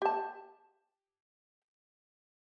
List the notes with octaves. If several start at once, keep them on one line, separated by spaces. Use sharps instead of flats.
G4 A5